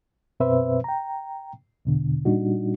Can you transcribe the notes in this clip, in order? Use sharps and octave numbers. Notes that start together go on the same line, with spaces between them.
F#2 B2 C4 B4 C5 E5
G5 A#5
E2 B2 D3
A#2 G3 D4 D#4 F#4